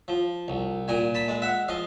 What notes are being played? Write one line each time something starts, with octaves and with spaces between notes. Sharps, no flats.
F3
C2
A#2 G#5 A#5
A5 B5
G#3
E5 F#5
F3 D#5 F5